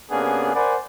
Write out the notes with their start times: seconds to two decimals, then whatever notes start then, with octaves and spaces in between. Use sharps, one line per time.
0.11 C3 A#3 B3 C#4 D4 G#4
0.55 A#4 C5 D5 F#5 G#5 B5